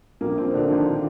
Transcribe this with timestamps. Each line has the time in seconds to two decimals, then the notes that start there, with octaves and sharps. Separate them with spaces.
0.21 A#1 A#3
0.38 F3 C4
0.54 A#2 D3 D4
0.65 F4
0.70 A#1 D#3 D#4